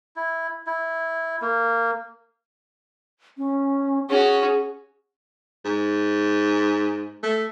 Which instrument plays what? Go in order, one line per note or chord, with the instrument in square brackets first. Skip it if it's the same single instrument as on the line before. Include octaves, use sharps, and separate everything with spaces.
[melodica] E4
E4
A#3
[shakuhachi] C#4
[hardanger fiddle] C#4 F#4 [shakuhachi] G#4
[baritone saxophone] G#2
A3